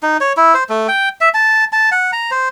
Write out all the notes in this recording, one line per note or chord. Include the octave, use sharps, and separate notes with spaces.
D#4
C#5
E4
C5
A3
G5
E5
A5
A5
F#5
A#5
C5